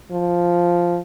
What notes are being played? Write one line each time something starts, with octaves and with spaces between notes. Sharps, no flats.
F3